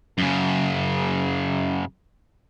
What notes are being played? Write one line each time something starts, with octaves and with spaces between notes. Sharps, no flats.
F#2 C#3